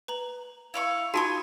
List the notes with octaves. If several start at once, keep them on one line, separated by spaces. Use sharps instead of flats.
B4 A#5 F#7
E4 F5 C#6
D#4 F4 F#4 G#5 A5 C6 D6 D#6